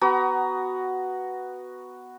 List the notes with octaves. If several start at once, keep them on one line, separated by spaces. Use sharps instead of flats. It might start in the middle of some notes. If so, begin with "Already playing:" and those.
B3 F#4 A#5